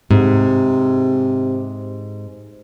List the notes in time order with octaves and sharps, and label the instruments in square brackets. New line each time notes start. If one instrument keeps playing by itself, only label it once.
[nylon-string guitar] G#2 [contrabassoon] C3